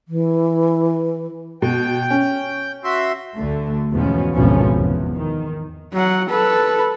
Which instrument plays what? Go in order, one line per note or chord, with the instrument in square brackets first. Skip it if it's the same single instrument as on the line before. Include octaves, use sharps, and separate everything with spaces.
[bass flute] E3
[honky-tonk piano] B2 [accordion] G5
[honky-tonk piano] C#4
[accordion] F#4 E5 C6
[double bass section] D2 D3 A3
E2 G#2 B2 F3 C#4
G#1 D2 B2 F3 C#4
E2
D#3
[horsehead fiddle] F#3 F#5
A4 B4